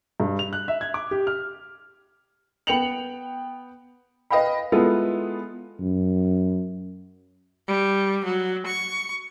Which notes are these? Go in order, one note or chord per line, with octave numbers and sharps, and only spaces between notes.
G2
F7
F#6
E5
G#6
D6
G4
F6
B3 G5 C#7 F7 F#7
B4 D#5 F5 G5 B5
G#3 B3 E4 F4 G#4 A4
F#2
G3
F#3
C#6